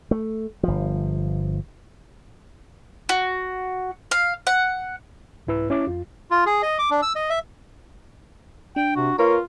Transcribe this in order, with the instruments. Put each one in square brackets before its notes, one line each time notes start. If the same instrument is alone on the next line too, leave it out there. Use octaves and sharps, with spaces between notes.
[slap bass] A3
G1 F3
[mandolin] F#4
F5
F#5
[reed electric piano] C2 G#2 E4 B4 E6
C#4 E4 C#5 D6
F2 F4
[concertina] F4
G#4
D#5
D6
D4
E6
D#5
E5
[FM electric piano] D4 [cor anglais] G5
[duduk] C3 [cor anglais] F#4
[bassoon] A#3 [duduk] F4 [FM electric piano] B4 [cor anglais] C#5